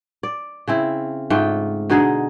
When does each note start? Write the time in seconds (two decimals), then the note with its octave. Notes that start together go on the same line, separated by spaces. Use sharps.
0.23 D5
0.68 C#3 C4 E4
1.30 G#2 A3 F4 G5
1.90 B2 D3 D#4 G#4